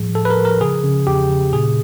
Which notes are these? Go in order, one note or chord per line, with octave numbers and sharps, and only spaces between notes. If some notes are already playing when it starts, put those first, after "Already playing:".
Already playing: A2 F3 G3 G#4
A2 A4
B4
A#4
F3
A#4
C#3 G#4
C#3
E2 G4
C#3
A#2 G#4